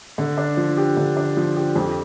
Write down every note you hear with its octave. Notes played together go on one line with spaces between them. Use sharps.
D3
D4
F3
G4
D3
D4
F3
G4
F2